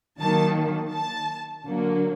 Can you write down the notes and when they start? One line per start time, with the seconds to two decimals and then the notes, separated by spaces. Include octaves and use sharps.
0.19 D#3 F#3 A#3 A5
0.93 A5
1.66 D3 F#3 A#3